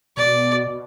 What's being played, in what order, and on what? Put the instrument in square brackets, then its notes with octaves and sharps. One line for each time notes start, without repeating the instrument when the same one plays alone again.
[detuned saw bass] B2 [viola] D5
[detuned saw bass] B2